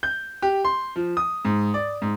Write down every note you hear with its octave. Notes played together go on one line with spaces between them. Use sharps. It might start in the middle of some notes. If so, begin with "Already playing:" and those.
G6
G4
C6
F3
D#6
G#2
D5
G#2